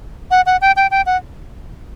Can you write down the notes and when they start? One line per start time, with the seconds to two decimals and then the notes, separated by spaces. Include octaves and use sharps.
0.31 F#5
0.46 F#5
0.61 G5
0.76 G5
0.91 G5
1.06 F#5